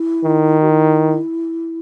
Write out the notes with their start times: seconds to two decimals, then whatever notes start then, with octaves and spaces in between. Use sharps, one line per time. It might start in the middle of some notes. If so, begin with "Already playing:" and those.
Already playing: E4
0.25 D#3
0.62 F#4
0.69 E4